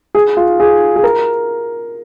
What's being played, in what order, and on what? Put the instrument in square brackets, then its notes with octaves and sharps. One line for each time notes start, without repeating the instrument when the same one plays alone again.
[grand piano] G#4
F4
G#4
G#4
A#4